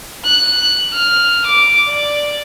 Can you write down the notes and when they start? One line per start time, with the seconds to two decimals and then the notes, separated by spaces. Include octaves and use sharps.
0.25 F#6
0.94 F6
1.47 D6
1.88 D5